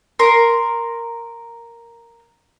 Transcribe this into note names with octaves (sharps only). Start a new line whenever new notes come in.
A#4 C6